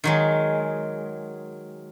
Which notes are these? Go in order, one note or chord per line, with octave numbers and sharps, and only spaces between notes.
D#3 F#3 G#3